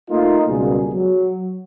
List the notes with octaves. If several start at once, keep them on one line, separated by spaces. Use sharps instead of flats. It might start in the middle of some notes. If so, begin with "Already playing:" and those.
A3 A#3 D#4 F4
C#2 B2 G3 A#3 G#4
F#3